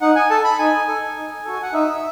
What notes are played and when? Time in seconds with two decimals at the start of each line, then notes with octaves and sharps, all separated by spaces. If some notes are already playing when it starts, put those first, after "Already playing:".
0.01 D#4 F#5
0.15 G#5
0.30 A4 A5
0.44 B5
0.59 D#4 G#5
0.88 A4
1.16 D#4
1.45 F#4 A4
1.62 F#5
1.73 D#4 E5